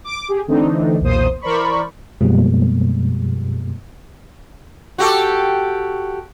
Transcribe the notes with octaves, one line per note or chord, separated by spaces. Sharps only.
D6
G4 G#4
D3 E3 A3 C4 D4 D#4
B1 E2 A#2 A#3 C5 D#6
E3 A#4 C5 D5 B5 C#6
F#2 B2 F3 G3 G#3 A#3
F#4 G4 A4